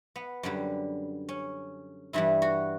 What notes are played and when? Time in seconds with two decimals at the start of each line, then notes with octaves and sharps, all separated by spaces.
0.16 B3
0.43 F#2 D3 G3
1.29 C#4
2.13 G2 E3 G3 E4
2.42 F#4